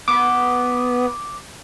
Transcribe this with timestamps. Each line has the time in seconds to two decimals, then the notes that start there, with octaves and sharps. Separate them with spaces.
0.08 B3 D6